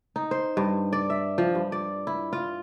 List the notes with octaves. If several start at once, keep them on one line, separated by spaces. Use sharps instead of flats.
D#4
C5
G2
D5
E5
F3
G2
D5
E4
F4